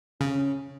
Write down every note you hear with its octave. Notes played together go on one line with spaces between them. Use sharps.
C#3 C#4